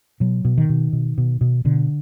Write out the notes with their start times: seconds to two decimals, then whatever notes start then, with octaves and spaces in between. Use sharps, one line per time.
0.20 B2 F#3
0.45 B2
0.58 D#3
0.69 B2
0.93 B2
1.18 B2
1.41 B2
1.65 B2 D3